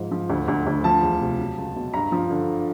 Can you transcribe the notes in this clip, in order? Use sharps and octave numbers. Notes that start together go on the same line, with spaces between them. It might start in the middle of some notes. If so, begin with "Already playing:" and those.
Already playing: G#2 F3
F3
D2
D2
D2
F3 A5
E2
C3
F#3
C#2
B2
G2 A#5
F3
D3